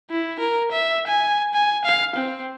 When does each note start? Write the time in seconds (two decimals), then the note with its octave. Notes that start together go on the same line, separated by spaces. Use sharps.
0.10 E4
0.40 A#4
0.72 E5
1.08 G#5
1.54 G#5
1.85 F5
2.16 C4